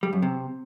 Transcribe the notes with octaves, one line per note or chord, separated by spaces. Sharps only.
G3
F#2
C3